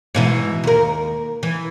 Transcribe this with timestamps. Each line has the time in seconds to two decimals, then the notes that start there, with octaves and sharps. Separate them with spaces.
0.15 G#2 B2 E3
0.63 D#2 A#4
1.43 E3